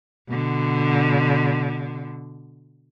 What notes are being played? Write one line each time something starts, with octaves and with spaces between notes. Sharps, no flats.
B2 D3